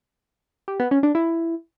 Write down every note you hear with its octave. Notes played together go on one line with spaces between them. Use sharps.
G4
B3
C#4
D4
E4